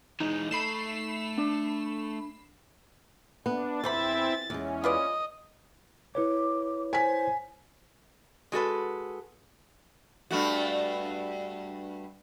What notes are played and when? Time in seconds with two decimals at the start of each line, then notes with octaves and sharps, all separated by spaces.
0.20 E3 G#3 D#4
0.51 A3 B5 C7 E7
1.37 D4
3.46 B3 D4
3.84 E2 E3 C4 E4 C5 E5 B5 A6
4.50 E2 G#3 C#4
4.84 F4 B4 D5 D#5
6.15 E4 B4 C#5 D6
6.93 C5 G#5 B6
8.52 G#3 F#4 A4 B4
10.31 G2 A3 F#4